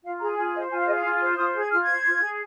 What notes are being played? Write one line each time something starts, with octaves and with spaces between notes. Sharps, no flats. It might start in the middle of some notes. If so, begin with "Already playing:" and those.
F4 F5
G#4 A#5
F4 G#5
C5 D#5
F4 G#5
F5
G#4 D#5
F5
F4
C5
F4 D#6
G#4
G#6
F4 F6
G#6
C5
F4
G#4